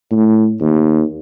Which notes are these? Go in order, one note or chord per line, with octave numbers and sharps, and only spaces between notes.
A2
D#2